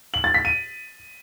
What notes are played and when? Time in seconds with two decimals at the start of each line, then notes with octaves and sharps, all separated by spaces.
0.14 F#7
0.24 A6
0.34 B6
0.45 D#7